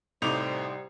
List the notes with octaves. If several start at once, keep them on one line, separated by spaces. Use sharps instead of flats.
C2 A2 G3 D#4 C5 D6 F7